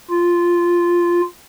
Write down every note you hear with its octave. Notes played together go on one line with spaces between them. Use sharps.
F4